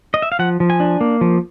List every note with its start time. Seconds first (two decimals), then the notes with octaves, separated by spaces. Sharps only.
0.14 D#5
0.22 E5
0.32 F5
0.39 F3 F#5
0.60 F3
0.70 G#5
0.80 D4
1.01 A#3
1.21 F3